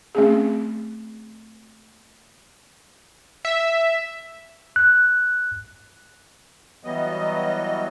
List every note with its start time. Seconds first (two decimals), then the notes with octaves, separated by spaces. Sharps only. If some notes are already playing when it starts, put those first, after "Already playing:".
0.15 A3 C4 C#4 G#4
3.45 E5
4.76 F#6
6.84 E3 F#3 G3 B3 D#5